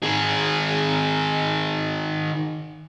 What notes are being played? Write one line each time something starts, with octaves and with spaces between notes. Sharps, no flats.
D#3 G#4